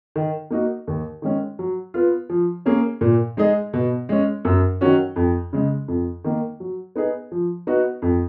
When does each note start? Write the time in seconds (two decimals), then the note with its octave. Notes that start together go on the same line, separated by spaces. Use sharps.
0.16 D#3
0.50 A#3 D#4 F#4
0.87 D#2
1.22 D#3 G#3 C#4
1.59 F#3
1.94 B3 F4
2.29 F3
2.66 A#3 C#4 G#4
3.01 A#2
3.37 G#3 D#4 G#4 D#5
3.74 B2
4.09 G#3 C#4
4.45 F#2
4.81 D#3 F#3 C#4 F#4
5.16 F2
5.53 C#3 G#3
5.88 F2
6.24 D#3 A#3
6.60 F#3
6.96 B3 D#4 G#4
7.32 F3
7.67 B3 D#4 F#4
8.02 F2